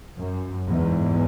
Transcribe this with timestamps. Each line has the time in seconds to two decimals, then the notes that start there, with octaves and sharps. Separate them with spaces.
0.17 F#2
0.67 E2 G#2